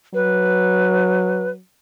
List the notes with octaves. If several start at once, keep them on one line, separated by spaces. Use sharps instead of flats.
F#3 B4